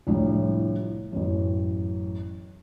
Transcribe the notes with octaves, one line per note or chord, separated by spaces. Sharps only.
C2 A2 F3 D4 C#5
A1 F#2